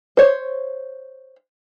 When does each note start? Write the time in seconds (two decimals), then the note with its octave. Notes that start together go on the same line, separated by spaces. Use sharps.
0.17 C5 C#5